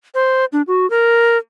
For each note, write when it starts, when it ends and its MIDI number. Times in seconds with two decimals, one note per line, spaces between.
0.14 0.45 72
0.53 0.62 62
0.67 0.89 66
0.90 1.38 70